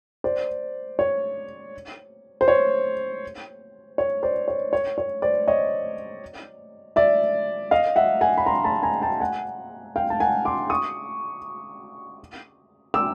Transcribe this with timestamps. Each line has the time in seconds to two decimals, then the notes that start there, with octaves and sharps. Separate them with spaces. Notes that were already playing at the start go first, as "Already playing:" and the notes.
0.24 C5 D5
0.99 C#5
2.41 C5
2.48 C#5
3.98 C#5
4.23 C5 D5
4.48 C#5
4.73 C#5
4.98 C#5
5.22 C5 D5
5.48 C#5 D#5
6.96 D5 E5
7.71 D#5 F5
7.96 E5 F#5
8.21 F#5 G#5
8.37 B5
8.46 A#5 C6
8.64 A5 B5
8.83 G#5 A#5
9.02 G5 A5
9.20 F#5 G#5
9.96 F5 G5
10.10 A5
10.20 F#5 G#5
10.45 C6 D6
10.70 C#6 D#6
12.94 D6 E6